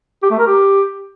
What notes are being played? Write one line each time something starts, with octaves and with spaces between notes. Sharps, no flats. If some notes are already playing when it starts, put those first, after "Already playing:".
G4
A3
A#4
G4